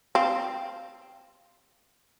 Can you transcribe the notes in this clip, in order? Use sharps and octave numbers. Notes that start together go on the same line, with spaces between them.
C4 F5